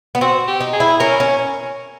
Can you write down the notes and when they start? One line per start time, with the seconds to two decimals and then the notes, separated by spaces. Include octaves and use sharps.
0.15 B3
0.21 C4 F#4
0.48 G4
0.61 D#4
0.73 G#4
0.80 E4
1.00 C#4 A#4
1.20 C#4